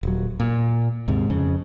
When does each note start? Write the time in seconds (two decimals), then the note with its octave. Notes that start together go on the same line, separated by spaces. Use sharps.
0.03 D#1 F#3
0.40 A#2
1.08 D#2 G#2 C3
1.30 F2 C#3